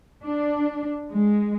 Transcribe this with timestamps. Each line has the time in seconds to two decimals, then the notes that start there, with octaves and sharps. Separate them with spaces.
0.25 D4
1.12 G#3